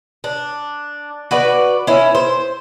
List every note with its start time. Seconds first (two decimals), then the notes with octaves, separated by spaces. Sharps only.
0.24 D4
1.31 F#4 B4 D5
1.87 C#4 E4
2.15 C5